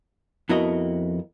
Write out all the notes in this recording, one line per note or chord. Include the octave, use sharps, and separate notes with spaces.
F2 B3 E4 F#4 A#4 D#5